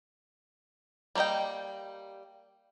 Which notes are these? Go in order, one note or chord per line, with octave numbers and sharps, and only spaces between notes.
G3 A#3 C5 D#5 G5